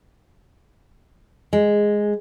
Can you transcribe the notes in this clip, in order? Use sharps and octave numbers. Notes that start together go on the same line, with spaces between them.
G#3